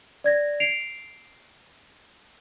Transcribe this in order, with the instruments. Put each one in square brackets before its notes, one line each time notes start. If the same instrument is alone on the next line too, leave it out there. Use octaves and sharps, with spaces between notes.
[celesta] D5 G#6 A#6
C7 D7 F7